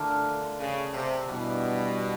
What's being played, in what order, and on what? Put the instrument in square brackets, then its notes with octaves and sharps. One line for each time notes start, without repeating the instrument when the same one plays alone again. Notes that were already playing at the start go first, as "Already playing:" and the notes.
Already playing: [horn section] D3 [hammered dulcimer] A3 D4 F4 A#4
[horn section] C#3
C3
[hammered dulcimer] G2 E3 G3 [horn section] B2